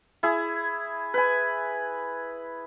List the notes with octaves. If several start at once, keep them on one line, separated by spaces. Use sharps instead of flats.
E4 G#4
B4 G#5